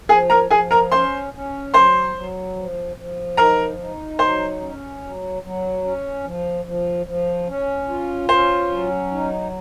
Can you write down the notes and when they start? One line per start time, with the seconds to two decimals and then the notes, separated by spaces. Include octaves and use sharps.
0.09 F3 G#4 G#5
0.30 A#4 A#5
0.51 F3 G#4 G#5
0.71 A#4 A#5
0.92 C#4 C5 C6
1.33 C#4
1.73 F#3 C5 C6
2.15 F#3
2.56 F3
2.97 F3
3.37 D#4 A#4 A#5
3.78 D#4
4.19 F#3 C5 C6
4.61 C#4
5.02 F#3
5.42 F#3
5.84 C#4
6.24 F3
6.65 F3
7.06 F3
7.48 C#4
7.88 F4
8.29 C#4 C5
8.71 F#3
9.12 D#4